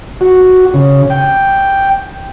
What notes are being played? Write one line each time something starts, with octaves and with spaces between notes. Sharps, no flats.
F#4
C#3
G5